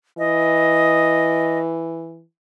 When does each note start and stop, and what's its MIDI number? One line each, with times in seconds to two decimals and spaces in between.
0.18 2.23 52
0.18 1.59 75